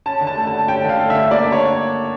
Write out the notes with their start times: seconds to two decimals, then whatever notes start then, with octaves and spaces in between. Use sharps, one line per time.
0.06 C#4 A5
0.21 D3
0.27 A5
0.37 A3
0.47 A5
0.53 D3
0.68 C#4 G5
0.84 D3 F5
1.00 A3
1.10 E5
1.16 D3
1.31 A#3 D5
1.46 D4
1.52 C#5